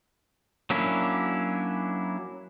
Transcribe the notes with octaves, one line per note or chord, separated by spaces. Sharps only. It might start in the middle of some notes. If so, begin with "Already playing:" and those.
F#3 A#3 C#4 D4 E4